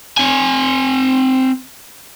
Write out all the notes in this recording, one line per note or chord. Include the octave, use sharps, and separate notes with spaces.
C4 G#5